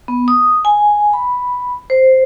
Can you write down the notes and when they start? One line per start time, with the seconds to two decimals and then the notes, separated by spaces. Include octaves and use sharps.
0.08 B3
0.28 D#6
0.65 G#5
1.13 B5
1.90 C5